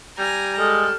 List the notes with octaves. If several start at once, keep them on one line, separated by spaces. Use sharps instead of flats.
G3 G#5 A#5
G#3 A4 F6